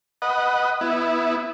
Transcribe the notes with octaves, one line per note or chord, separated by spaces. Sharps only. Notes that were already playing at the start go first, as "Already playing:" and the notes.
B4 D#5 F#5
B3 E4